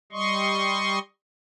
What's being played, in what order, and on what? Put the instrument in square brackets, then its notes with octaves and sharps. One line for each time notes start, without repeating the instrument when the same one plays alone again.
[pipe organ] G3 D#5 C6 C#6